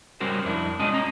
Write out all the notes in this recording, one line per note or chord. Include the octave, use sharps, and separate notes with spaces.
G3 C#4 F#4 A#4 C5
F2 D4 E4
G#3 C#4 D4 F4 D#5
C#4 A#5